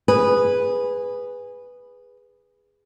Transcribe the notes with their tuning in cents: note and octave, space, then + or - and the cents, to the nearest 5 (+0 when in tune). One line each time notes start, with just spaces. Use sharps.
G#4 -15 B4 +0